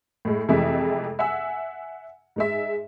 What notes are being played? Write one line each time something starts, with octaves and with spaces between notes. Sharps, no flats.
A2 G#3
F2 C3 E3 G#3 A3 E5
E5 F#5 G#5 E6
G#2 G#3 E5